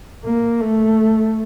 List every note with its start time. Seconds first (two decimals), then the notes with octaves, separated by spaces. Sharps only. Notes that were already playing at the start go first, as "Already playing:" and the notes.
0.24 A#3
0.60 A3